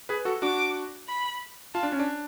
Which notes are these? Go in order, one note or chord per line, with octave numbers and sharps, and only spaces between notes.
G#4 B4
F#4 A4
D4 F#4 D6
B5
F4 A5
D4
C#4
D4